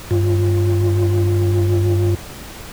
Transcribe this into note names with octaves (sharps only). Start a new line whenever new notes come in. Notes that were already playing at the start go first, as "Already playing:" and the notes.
G2 F4